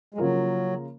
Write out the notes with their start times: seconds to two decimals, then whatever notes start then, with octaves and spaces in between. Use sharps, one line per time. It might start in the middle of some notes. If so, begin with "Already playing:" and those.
0.14 G#3
0.18 C#3 F3 F#3 A#3 F4 A#4